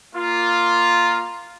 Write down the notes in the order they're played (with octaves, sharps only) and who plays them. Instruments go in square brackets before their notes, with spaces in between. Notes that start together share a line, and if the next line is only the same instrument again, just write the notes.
[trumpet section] A#3 F4